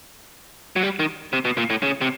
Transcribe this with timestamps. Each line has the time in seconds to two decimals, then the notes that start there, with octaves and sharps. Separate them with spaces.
0.76 F#3
0.83 G3
0.99 D#3
1.33 C3
1.45 B2
1.58 A#2
1.70 A2
1.83 C#3
2.01 C3